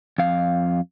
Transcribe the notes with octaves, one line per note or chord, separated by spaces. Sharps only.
F2 F5